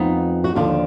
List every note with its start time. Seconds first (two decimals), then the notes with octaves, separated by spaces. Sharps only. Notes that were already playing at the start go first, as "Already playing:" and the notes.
Already playing: F2 F3 B3 D#4
0.44 F#4
0.55 D#2 D3 F3 D4 F4